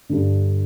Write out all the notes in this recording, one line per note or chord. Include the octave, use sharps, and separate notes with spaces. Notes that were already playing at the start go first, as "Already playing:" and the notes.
G2 D3